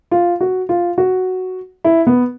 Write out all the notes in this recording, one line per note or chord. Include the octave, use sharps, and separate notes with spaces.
F4
F#4
F4
F#4
E4
B3